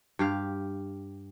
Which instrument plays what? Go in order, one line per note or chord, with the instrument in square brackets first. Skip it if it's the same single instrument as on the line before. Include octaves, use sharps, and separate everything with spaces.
[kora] G2 G4 F5